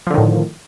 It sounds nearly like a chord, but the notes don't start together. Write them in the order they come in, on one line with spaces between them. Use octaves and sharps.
F3 D3 D#3 A2